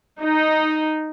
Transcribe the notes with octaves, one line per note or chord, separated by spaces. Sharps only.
D#4